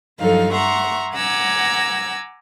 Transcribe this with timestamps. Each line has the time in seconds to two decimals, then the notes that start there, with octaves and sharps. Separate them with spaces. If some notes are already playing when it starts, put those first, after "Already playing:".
0.20 G2 F3 F#3 D#4 A4 F5
0.54 E5 F#5 A#5 C6 C#6
1.15 F#5 G#5 A#5 D6 E6 G#6